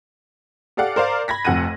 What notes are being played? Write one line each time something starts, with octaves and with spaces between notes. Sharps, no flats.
G4 A4 D5 F5 F#5
A#4 C5 D5 F5
B5 G#6 A#6 B6
F1 F2 F#5 F#6 A#6 D#7